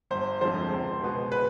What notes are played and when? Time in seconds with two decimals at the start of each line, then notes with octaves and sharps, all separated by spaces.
0.11 G1 C5
0.41 F2 D3 F3 G#3 C5
0.71 C#2
1.01 B2 G#3 B3
1.32 B4